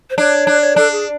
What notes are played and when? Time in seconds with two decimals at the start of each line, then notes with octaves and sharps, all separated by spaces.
0.10 C5
0.18 D4 C#5
0.47 D4
0.61 C#5
0.76 D4 A4
0.91 G#4